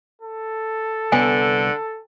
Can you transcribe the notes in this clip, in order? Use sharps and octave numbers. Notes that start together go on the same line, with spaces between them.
A4
C2 D3 B3 G#5